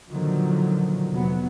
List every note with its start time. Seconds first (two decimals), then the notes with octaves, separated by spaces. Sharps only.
0.10 A#2 D3 D#3 F3 F#3
1.10 F1 F#3 B3